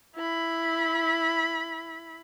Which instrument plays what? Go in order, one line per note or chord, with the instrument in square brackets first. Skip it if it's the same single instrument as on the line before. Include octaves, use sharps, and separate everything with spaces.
[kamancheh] E4 B5